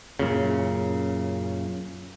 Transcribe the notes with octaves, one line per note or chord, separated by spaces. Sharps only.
F#2 A#2 C#3